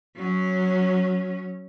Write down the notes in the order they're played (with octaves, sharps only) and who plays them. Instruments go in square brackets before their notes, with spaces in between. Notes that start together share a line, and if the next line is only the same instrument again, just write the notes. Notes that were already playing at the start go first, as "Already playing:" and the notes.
[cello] F#3 C#4